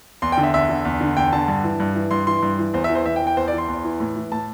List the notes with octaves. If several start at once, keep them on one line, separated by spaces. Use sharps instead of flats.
E2 C6
G5
D3
E5
E2 E5
D3
E2
D3
E2 G5
D3 A5
G2
E3
G2
E3
G2 C6
E3 C6
G2
E3
E2 C5
E5
E3
C5
E2 E5
G5
E3
G5
E2 C5
D5
E3
C6
E2
E3
A2
E3
A2 A5